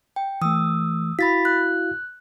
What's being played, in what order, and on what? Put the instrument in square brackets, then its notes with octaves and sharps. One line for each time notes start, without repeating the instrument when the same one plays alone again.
[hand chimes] G5
[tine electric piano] E3 A3 [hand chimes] D#6 E6
[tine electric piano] E4 F#4 F5 [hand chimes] B5 A6 B6
[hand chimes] F#6